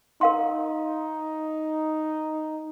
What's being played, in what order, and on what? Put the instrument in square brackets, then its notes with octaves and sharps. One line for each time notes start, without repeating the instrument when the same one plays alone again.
[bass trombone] D#4 [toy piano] A#4 F5 C6